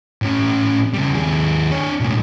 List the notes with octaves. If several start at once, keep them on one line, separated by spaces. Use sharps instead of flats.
A2 C#4
C#3 G3
D#2 G#4
D4 C#5
B1 A2